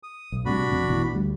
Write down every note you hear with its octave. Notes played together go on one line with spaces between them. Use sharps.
D#6
B1
A2 C3 G3 D4 F#4 B5
F2 C3
A1 B2 E3
D2 G3